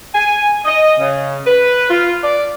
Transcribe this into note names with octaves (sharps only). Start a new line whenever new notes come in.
G#5
D#5
C#3
B4
F4
D5